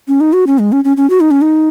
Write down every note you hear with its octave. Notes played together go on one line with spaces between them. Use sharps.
C#4
D#4
F#4
C#4
G#3
C#4
C#4
C#4
F#4
D#4
C#4
D#4